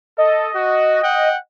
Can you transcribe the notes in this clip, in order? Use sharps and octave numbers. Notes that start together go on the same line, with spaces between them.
A4 D#5
F#4
F#5 G5